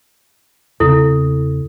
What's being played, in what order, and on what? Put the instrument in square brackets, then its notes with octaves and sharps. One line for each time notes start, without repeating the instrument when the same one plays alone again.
[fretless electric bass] E2 C#3 C4 [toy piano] E4 A4